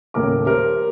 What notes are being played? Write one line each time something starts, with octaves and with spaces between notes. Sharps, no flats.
D#1 A2 C#3 A#4 D6
G4 A#4 C5